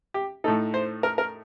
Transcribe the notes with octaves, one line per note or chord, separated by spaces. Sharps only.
G4
A2 A3 D#4 A4
C5
A#4
A#4